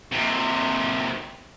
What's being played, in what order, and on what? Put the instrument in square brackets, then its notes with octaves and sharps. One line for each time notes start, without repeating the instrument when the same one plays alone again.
[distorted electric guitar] D#2 C3